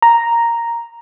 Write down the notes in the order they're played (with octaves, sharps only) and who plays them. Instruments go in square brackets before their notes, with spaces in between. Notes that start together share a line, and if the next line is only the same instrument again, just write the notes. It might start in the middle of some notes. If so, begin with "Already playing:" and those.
[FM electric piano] A#5